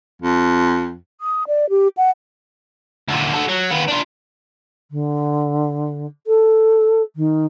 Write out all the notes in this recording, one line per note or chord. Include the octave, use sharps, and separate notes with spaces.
F2
D#6
D5
G4
F#5
D2 A#2
F#4 A4
F#3
D#2 B3
D4 F4
D3
A4
D#3